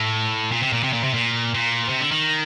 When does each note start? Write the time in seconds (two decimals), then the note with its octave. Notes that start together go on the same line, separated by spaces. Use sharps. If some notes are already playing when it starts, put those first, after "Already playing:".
Already playing: A2
0.52 A#2
0.62 C3
0.73 A#2
0.83 C3
0.93 A#2
1.04 C3
1.14 A#2
1.55 A#2
1.89 C3
2.01 D3
2.12 D#3